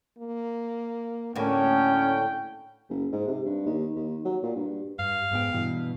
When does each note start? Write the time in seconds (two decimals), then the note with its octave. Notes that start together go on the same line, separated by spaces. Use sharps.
0.18 A#3
1.36 D2 A2 D3 A#3 C#4 G5
2.90 F#1
3.12 G#2
3.27 C3
3.45 G2
3.66 D#2
3.96 D#2
4.25 F#3
4.43 A#2
4.56 G2
4.99 G2 F5
5.31 G#2 B3 G5
5.53 G2 B2 E3